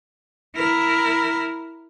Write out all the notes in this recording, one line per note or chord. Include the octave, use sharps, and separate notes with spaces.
E4 A#4